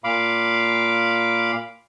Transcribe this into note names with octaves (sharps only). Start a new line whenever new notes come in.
A#2 F5 B5 D6